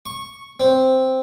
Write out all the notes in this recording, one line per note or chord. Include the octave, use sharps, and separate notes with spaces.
C#6
C4